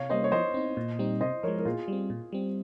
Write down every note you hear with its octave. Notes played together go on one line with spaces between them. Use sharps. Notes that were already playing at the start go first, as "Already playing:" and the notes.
Already playing: C3 C#5 F5
G3 A#3 C#4 C5 D#5
C#5
F3 C5 D#5
C4 D#4
A#2
G3 C4 D#4
C3 C5 D#5
F3 G#3 A#4 C#5
A#4
A#2 F4 G#4
G3 C4
A#2
G3 C4